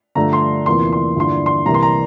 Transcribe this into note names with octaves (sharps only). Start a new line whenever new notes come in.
G2 D3 F3 A3 A#5
C6
E2 C3 E3 A#3 F4 C6
C6
G2 D3 F3 A#3 E4 C6
C6
C2 C3 E3 G3 A#3 A#5
C6
A#5